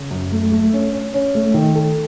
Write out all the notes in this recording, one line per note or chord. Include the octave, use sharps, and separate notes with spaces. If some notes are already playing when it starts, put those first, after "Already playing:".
Already playing: C#3
F#2
A3
A3
C#4
C#4
C#4
A3
D#3
A4